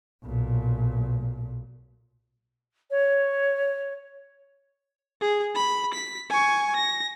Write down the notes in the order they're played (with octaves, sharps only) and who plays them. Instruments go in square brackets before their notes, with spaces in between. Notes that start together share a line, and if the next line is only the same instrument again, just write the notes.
[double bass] B1 A#2
[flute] C#5
[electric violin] G#4
B5
B6
G#5 C#6
A#6